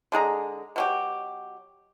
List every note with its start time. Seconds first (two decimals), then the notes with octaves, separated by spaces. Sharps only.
0.12 D3 G#3 G#4 A#5
0.76 B2 F#3 G4